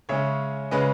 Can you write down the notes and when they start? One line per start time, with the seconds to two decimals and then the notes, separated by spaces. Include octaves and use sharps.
0.09 C#3 G#3 C#4 C#5 E5
0.71 C#3 G#3 C#4 B4 D#5